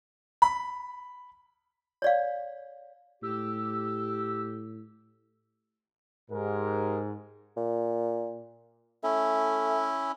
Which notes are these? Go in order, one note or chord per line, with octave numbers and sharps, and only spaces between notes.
B5
C#5 D5 F5
A2 G4 E6
G#2 G4 G#4 A#4
A#2
A3 C#4 E4